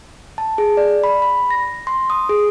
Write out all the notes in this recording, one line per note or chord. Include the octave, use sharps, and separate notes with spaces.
A5
G#4
D5
B5
B5
A#6
C6
D#6
G#4